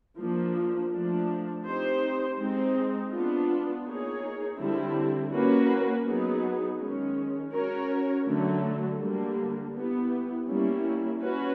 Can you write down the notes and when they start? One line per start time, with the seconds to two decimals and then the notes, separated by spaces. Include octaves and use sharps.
0.18 F3 A#3 D4
0.91 F3 A3 D4
1.65 C4 D#4 G4 C5
2.38 G#3 C4 D#4
3.12 B3 D4 F4
3.86 A#3 D#4 G#4 C#5
4.58 D3 G3 C4 E4
5.33 A#3 C#4 F#4 B4
6.07 F#3 B3 D#4 G#4
6.80 D#3 G#3 C#4
7.53 C#4 F#4 A#4 C#5
8.27 D3 F#3 A3
9.00 D3 G3 A#3
9.74 B3 E4 G4
10.48 G3 A#3 C#4 E4
11.22 C#4 F#4 B4